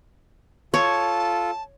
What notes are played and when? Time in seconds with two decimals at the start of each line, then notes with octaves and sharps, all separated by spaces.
0.74 F4 A4 C#5 A5